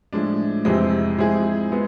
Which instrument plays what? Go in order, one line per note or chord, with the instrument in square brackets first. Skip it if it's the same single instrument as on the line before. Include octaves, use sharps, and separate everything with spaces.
[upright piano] A2 F3 G#3 D4
F2 C3 E3 G#3 C4
F3 G#3 C4 E4 G#4
G#3 B3